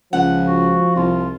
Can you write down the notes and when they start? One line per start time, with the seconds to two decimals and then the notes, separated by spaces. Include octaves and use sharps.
0.13 C#2 F3 F#5
0.46 F#4
0.96 C2 F4